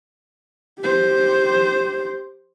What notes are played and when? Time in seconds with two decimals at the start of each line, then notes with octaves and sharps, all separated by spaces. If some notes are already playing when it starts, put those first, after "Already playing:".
0.80 G4 C5